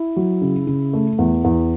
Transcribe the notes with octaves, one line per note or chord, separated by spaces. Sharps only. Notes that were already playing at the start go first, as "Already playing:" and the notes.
Already playing: E4
F#3
C#3
C#3
A3
E2
E2